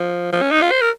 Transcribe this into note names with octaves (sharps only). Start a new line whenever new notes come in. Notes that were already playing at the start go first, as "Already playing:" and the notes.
Already playing: F3
F3
C#4
D#4
F4
C5
A#4